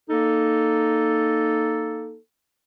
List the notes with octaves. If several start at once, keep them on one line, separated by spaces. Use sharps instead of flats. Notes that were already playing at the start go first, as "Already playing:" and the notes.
A#3 D#4 A4